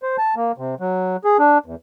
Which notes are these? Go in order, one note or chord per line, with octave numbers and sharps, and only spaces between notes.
C5
A5
A#3
C3
F#3
G#4
D4
E2